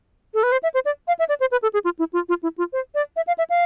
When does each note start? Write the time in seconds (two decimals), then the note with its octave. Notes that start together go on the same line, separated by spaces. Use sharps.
0.34 A4
0.43 B4
0.52 C5
0.63 E5
0.74 C5
0.85 D5
1.08 F5
1.19 E5
1.29 D5
1.40 C5
1.52 B4
1.62 A4
1.73 G#4
1.84 F4
1.99 E4
2.13 F4
2.29 F4
2.43 E4
2.58 F4
2.73 C5
2.95 D5
3.16 E5
3.27 F5
3.38 E5
3.50 F5